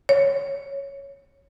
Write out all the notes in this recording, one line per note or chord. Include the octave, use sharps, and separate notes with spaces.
C#5